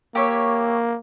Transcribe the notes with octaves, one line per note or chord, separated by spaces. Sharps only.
A#3 G4 C#5 E5